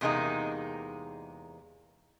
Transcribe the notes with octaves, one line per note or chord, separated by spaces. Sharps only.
E2 C3 G#3 A#3 D#4